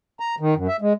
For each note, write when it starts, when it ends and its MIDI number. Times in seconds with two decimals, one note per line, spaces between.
0.20 0.35 82
0.40 0.54 51
0.56 0.67 42
0.68 0.76 76
0.81 0.93 56